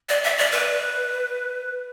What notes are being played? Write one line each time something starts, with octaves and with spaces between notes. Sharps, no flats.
D5
E5
D5
B4